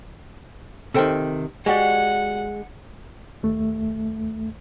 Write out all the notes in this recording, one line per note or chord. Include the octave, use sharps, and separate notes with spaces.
C3 D#3 A4 C5 G5
G#3 F#4 G4 D5 F#5
D#2 A3